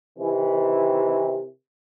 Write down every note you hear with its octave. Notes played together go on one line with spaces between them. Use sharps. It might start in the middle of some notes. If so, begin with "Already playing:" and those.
C3 D#3 E3